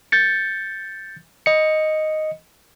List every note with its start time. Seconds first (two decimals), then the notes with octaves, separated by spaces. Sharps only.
0.12 G6 A6 C#7
1.46 D#5 C#7